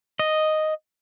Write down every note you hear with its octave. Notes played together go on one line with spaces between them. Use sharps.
D#5